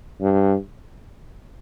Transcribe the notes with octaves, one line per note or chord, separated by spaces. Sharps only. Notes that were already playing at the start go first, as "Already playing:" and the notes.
G2